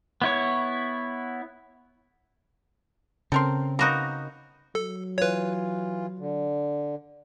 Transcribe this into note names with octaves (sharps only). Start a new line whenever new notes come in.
B3 E4 C#5
C#3 C4 A4 A#4 C6
A#3 B3 D#4 F#4 A#4
F#3 A4
E3 F4 B4 C#5
D3